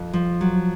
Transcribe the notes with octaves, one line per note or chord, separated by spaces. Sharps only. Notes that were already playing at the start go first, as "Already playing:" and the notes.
Already playing: F2
F3
F#3